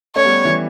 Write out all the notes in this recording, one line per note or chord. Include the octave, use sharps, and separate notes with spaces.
A3 C#4 C#5
G3 B3
E3 G3